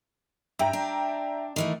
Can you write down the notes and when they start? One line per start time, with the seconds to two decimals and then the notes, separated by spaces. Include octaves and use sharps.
0.59 G2 E5 G5 A#5
0.73 D4
1.56 D#3 E3 A3